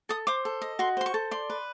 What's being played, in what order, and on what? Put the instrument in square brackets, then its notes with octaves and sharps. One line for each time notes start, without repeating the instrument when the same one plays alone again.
[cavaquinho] A4 D#6
C5 D6
A4
D#5
F#4 C6
C5 C6
C#6
A4
D5 C6
B4